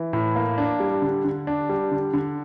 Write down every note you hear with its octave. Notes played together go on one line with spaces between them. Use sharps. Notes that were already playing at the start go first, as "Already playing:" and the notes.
Already playing: E3
A2
A#3
D4
G3
D3
D3
D4
G3
D3
D3